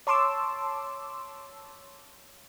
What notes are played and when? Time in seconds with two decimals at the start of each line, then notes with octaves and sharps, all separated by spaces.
0.07 C#5 A5 C6 D6 E6